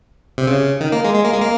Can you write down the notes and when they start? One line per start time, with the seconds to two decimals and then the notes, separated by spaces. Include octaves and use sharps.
0.38 C3
0.47 C#3
0.81 D#3
0.92 A#3
1.04 G#3
1.15 G#3
1.25 A#3
1.32 G#3
1.41 A#3